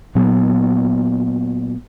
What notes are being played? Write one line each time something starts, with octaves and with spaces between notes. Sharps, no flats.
A#2 F#3 B3